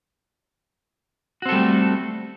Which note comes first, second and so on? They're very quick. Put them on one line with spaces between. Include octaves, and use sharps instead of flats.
F#4 C4 A4 G3 A3